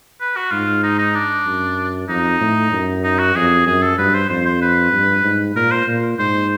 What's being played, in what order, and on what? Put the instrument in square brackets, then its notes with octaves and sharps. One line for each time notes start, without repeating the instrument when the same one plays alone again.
[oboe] B4
F#4
[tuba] G#2 [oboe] F4
[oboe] D#4
D#4
D4
[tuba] F#2
[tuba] F2 [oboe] D#4
[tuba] A2
F#2
[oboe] D#4
F#4
[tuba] F2 [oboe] G#4
[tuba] F#2 [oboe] G#4
[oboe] A4
[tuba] G2 [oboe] B4
[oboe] C5
[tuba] F2 [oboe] C5
[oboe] C5
B4
[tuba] G2
G#2
[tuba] A#2 [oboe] A#4
[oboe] C5
[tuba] A#2
[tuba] G#2 [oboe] C5